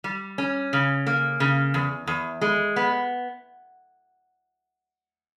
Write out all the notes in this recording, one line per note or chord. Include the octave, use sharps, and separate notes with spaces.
G3
C#4
C#3
A#3
C#3
E2
E2
G#3
B3